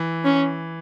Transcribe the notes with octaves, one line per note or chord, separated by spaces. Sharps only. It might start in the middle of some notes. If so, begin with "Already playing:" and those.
Already playing: E3
C#4